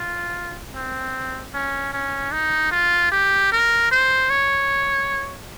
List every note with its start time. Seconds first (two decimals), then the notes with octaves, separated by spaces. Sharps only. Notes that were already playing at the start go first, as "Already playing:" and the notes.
Already playing: F4
0.75 C4
1.54 C#4
1.93 C#4
2.32 D#4
2.71 F4
3.12 G4
3.52 A#4
3.91 C5
4.30 C#5